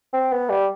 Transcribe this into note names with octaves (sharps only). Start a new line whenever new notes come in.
C4
B3
G3